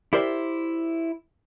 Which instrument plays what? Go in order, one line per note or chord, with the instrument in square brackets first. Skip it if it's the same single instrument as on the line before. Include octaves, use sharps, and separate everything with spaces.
[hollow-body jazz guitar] E4 G4 A#4 C5 D5 E5